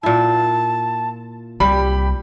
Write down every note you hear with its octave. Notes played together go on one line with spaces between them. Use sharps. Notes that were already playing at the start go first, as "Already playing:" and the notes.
A#2 E4 A5
C2 G3 G4 B5